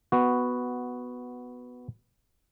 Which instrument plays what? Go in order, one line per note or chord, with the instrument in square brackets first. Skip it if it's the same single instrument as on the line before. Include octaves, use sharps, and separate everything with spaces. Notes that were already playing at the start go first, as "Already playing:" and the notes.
[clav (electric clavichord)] B3 F#4